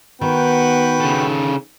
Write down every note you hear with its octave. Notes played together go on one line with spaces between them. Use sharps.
D#3 B3 F#4 B4 G5
C#3 A4